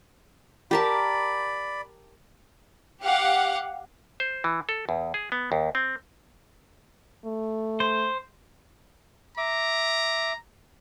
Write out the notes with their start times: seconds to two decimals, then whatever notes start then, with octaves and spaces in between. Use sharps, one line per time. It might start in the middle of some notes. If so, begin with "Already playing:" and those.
0.71 G4 A#4 D5 A5 B5
3.02 G4 F5 F#5
4.20 C5
4.44 E3
4.69 A4
4.89 E2
5.14 G#4
5.32 B3
5.52 D#2
5.75 C4
7.25 A3
7.80 C5
9.38 E5 A#5 D6